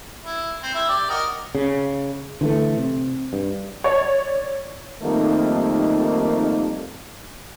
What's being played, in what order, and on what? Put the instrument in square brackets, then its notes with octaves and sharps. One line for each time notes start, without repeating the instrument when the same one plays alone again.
[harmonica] E4
C4
E4 E5
G4 D5
F#4 A#4 D#5
[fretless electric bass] C#3
D3 E3 G#3 A3
C3
G2
[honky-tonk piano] C#5 D5
[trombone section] F2 D#3 G3 A3 A#3 D#4